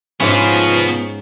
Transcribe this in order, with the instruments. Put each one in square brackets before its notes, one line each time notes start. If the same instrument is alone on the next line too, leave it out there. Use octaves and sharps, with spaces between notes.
[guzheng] G#2 C#4 [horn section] F3 [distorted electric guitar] B3 F#4